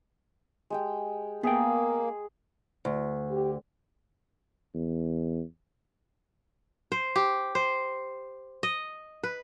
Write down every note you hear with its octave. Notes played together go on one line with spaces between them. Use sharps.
G#3 G4 G5
A#3 B3 G#4 E5 G5
D2
G4
E2
C5
G4
C5
D#5
B4